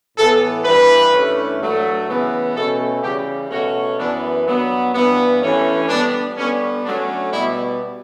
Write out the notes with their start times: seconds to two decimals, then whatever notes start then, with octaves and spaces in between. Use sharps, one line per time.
0.17 A2 E3 B3 A4
0.65 G2 E3 G3 B4
1.12 G2 E3 A3 C#4
1.60 G2 F#3 A3
2.07 C#3 E3 B3
2.55 B2 A3 C#4 A4
3.03 C#3 E3 G3 G4
3.51 B2 A3 C#4 F#4
3.99 F#2 E3 B3 D4
4.47 G2 F#3 B3
4.94 G2 E3 B3
5.42 G2 E3 A3 C#4
5.89 D3 G3 B3 D4
6.36 D3 G3 B3 C#4
6.85 D3 F#3 A3 C#4 D4
7.32 B2 G3 B3 E4